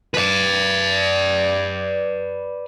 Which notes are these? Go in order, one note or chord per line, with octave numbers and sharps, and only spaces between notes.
B4 D5